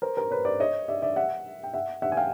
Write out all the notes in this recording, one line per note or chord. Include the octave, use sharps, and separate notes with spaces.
A#4 C5
A#4 C5
B4 C#5
C5 D5
C#5 D#5
D5 E5
D5 E5
E5 F#5
G5
E5 F#5
E5 F#5
G#5
F5 G5